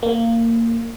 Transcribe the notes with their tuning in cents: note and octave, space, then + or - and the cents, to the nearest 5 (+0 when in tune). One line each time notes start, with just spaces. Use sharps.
A#3 -20